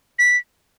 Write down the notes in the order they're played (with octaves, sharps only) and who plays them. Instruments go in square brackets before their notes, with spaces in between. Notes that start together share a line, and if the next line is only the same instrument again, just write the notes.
[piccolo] B6